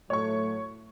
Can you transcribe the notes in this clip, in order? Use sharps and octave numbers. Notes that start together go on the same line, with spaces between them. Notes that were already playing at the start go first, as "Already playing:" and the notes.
A2 F#3 A3 C#5 C#6